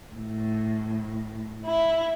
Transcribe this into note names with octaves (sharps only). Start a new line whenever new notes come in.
A2
E4